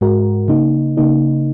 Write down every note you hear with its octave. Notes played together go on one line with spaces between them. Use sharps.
G#2 G#3 F#4 A#4
C#3 A#3 D#4
C#3 A#3 D#4